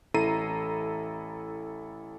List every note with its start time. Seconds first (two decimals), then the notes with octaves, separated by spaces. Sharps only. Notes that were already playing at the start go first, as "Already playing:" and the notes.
0.14 A1 E4 A4 A#5 C7 D#7